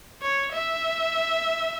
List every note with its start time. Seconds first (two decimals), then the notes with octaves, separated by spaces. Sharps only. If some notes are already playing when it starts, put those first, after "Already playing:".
0.22 C#5
0.53 E5